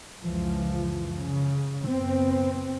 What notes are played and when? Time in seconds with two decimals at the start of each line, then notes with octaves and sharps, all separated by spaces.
0.21 C#2 F#2 E3 F3
1.18 C#3
1.86 F#1 B3 C4